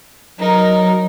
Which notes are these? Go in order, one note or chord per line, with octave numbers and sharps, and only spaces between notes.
F#3 D#4 A#4